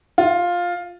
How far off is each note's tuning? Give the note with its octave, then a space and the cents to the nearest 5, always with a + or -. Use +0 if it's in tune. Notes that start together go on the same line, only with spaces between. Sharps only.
F4 +10